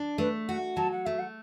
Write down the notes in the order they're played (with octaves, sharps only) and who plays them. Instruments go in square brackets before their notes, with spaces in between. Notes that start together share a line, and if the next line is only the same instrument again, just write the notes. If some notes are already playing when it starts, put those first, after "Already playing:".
Already playing: [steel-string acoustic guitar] D4
[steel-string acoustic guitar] A3 [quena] B4
[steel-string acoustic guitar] F#4 [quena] F#5
[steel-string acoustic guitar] F#3 [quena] A5
[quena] F#5
[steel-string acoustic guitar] A3 [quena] E5
[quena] F#5